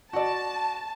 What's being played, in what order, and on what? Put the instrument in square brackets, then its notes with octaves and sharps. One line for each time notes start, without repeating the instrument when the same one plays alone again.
[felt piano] F#4 D5 [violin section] A5